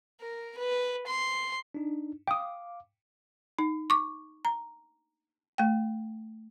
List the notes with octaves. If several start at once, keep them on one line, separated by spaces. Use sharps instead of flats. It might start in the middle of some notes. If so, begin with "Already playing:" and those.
A#4
B4
C6
D4 D#4
F5 G5 D6 D#6
D#4
C#6 D6
A#5
A3 G5